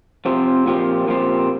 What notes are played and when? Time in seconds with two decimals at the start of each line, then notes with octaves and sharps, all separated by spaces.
0.26 C3 F3 C4 G4
0.66 A#2 F3 C4 G4
1.08 A#2 F3 C4 G4